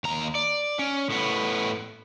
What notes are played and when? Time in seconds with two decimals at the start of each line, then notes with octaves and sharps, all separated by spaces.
0.04 D#2 A#5
0.35 D5
0.79 C#4
1.10 A2 B3